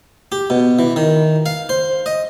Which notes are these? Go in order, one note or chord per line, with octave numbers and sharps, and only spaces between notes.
G4
B2
E3
D#3
F5
C5
D#5